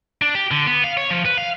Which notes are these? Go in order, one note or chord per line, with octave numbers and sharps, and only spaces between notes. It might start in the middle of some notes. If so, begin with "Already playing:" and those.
D4
G4
D3
B3
F5
C#5
F3
B4
F5